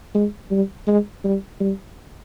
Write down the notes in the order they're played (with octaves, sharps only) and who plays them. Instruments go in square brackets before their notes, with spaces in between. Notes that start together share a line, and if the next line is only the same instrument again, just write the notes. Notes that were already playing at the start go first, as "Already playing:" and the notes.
[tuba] G#3
G3
G#3
G3
G3